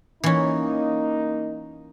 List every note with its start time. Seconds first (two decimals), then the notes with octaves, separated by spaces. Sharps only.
0.24 E3 A#3 C#4 D#4